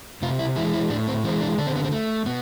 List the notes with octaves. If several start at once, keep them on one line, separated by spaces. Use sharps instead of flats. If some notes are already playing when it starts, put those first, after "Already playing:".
C3 F4
E4
E3 G#3 E4
E4
A2 D4
C4
E3 G#3 C4
D4
D3 D4
C4
B3
C4
A3
B2 B3